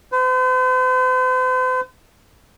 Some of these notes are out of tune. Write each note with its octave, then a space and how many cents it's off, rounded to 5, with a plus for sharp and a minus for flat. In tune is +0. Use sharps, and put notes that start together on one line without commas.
C5 -45